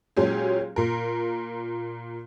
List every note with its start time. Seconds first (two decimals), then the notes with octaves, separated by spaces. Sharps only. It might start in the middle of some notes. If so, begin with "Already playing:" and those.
0.17 A#2 F#3 G#3 C#4 G4 G#4
0.76 A#2 A#4